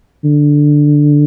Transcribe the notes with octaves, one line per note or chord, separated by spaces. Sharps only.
D3